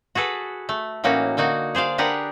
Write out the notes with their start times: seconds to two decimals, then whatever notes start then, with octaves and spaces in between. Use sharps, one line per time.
0.15 F#4 G#4 A4 B4
0.69 A3
1.04 A2 E3 A#3 C#4 D#4 F#4
1.37 D3 A#3 D#4 F#4
1.75 G#4 C5 D5 F5
1.98 D4 G4 G#4 A#4 B4 F#5